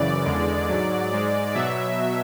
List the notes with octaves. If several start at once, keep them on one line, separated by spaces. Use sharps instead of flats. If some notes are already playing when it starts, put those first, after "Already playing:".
Already playing: F#2 C#3 E3 D5
E2 D3 G#3
G#2 F#3
G#2 G#3
B2 F#3 E5